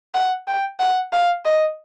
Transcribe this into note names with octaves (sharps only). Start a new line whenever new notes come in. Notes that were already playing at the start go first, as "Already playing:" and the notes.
F#5
G5
F#5
F5
D#5